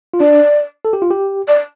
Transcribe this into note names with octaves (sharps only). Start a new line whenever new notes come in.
F4
D4 D5
A4
G4
F4
G4
D5